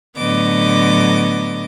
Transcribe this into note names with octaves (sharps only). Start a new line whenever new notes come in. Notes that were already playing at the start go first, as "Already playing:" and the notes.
A2 D3 F#3 B3 D#5 D6